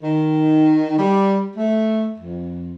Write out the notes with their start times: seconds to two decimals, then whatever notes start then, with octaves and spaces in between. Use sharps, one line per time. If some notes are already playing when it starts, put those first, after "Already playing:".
0.03 D#3
0.98 G3
1.56 A3
2.18 F2